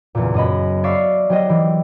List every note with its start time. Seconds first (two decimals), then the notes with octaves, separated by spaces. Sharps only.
0.15 F#1 E2 A#2
0.34 F#2 D#5 B5
0.84 D5 E5 F5 C#6 C7
1.29 F#3 C4 G4 C5 D#5
1.49 E3 G4